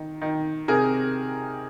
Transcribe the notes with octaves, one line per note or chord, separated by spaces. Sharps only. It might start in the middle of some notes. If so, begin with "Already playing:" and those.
Already playing: D#3
D#3
C3 G#4 A#4